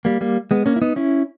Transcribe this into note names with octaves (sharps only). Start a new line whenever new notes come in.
G3 A#3
G3 A#3
G#3 B3
A#3 C#4
E4
B3 D#4
C#4 E4